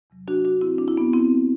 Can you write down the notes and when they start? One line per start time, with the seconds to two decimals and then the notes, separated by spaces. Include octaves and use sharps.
0.10 E2 C3 F#3
0.28 D4 F#4
0.45 D4 F#4
0.61 C4 E4
0.78 D4
0.88 E4
0.97 B3 D4
1.13 C4 E4